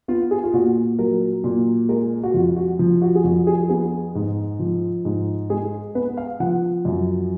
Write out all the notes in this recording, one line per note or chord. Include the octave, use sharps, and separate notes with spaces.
B3 F4
G#4
F4
A#2 F#4
F#3 A#4
A#2
G#3 A#4
F#4
F2 F4
F#4
F3
F#4
G#4
F2 F#4
G#4
B3 G#4
G#2
F3
G#2
G#3 G#4
B3 B4
F5
F3 F#5
F#2